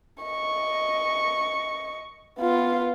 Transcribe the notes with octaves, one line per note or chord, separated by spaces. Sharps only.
D#5 C#6
B3 F4